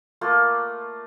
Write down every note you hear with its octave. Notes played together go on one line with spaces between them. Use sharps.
A3 A#3 F4